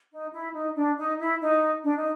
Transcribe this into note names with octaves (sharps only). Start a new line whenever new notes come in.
D#4
E4
D#4
D4
D#4
E4
D#4
D4
D#4